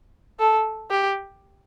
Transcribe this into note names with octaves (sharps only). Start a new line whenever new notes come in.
A4
G4